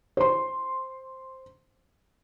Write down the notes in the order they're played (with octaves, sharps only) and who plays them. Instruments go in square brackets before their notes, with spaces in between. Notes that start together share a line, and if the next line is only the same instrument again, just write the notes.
[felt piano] C5 C6